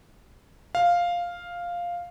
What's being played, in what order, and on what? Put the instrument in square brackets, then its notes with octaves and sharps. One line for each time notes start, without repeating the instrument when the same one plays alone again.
[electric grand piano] F5